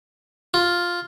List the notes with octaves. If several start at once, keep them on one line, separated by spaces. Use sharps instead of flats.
F4